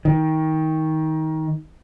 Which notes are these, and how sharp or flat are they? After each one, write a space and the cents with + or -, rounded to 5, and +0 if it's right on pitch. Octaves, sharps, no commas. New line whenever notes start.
D#3 +20